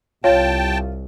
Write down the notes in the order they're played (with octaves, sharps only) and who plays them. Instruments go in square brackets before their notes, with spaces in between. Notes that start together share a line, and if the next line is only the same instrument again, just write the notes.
[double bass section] C2 [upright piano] F4 [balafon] C#5 [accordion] G5 A5